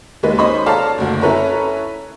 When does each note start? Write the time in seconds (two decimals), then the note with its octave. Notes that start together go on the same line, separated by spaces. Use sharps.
0.23 D#2 G#3 D#4 B4
0.38 C#4 D#4 C5 D#5 B5 C#6
0.66 A4 C#5 D5 F5 A5 A#5
0.98 F#1 D2
1.21 C#4 E4 A4 B4 C#5 A#5